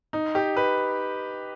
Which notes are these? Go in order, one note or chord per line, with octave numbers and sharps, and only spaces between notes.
D#4
G4
B4